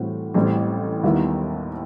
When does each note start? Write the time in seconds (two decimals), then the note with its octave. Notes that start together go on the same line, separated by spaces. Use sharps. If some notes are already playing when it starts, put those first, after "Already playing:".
Already playing: A2 E3 G3 C4 F#4
0.34 A1 A2 G3 C4
1.03 D#2 D#3 G3 B3 E4